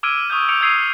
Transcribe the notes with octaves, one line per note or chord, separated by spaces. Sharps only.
D6 E6 F6 G#6 D7 D#7
C#6 D#6 F6 G6
D6 E6 G6 C#7 D7 F7
D#6 E6 G#6 C7 D7 D#7